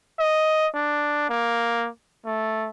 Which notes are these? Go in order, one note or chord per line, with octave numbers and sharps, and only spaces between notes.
D#5
D4
A#3
A3